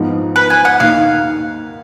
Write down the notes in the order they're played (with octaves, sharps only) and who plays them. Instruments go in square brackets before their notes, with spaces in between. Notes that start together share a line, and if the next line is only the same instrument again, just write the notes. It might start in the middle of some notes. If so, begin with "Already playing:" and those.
Already playing: [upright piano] G#2 F3 B3 D#4
[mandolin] B4
G#5
F#5
[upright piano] D#2 D#3 A#3 D#4 [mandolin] F5